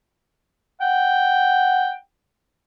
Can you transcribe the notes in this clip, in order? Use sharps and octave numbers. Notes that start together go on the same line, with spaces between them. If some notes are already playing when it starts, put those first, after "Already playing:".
F#5 G5